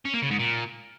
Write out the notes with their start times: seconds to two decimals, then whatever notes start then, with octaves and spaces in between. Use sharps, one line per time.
0.05 C#4
0.14 A#3
0.22 C#3
0.31 G#2
0.39 A#2